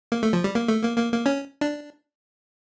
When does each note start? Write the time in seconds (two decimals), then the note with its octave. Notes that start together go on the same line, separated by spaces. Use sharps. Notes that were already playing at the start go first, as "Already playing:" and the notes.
0.12 A#3
0.23 A3
0.33 F3
0.44 G3
0.55 A#3
0.68 A3
0.83 A#3
0.98 A#3
1.12 A#3
1.26 C#4
1.61 D4